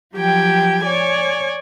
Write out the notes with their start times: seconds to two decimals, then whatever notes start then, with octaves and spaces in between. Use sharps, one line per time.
0.14 F3 F#3 G4 G5 G#6
0.83 C#5 D5 G#5